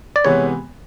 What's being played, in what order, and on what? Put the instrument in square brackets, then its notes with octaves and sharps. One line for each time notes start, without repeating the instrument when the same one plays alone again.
[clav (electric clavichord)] D5
[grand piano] C3 E3 G#3 B3 [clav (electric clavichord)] C#5